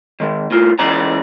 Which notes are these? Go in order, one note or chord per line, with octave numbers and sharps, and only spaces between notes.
D#3 G#3
A2 F4
C#2 C#3 E3 D5 A#5